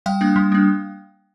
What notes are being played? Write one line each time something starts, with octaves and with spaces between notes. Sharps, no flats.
G3 F5 G5
A#3 D4
G3
A#3 D4